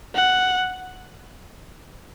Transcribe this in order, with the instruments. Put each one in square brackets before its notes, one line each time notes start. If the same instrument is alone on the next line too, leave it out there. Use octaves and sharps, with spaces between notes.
[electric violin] F#5